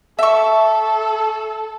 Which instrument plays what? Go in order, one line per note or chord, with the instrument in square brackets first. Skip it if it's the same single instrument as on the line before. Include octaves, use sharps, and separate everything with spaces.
[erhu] A4 [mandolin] E5 C#6